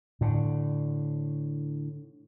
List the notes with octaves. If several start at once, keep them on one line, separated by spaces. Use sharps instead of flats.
A2 D3